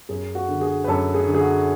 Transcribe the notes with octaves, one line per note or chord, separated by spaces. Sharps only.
F#2 G#4
F#4
D3
G#4
B4
F#2 A4
G#4
D3
G#4
F#4